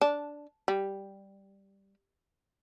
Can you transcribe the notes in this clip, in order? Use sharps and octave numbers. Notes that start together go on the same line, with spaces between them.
D4
G3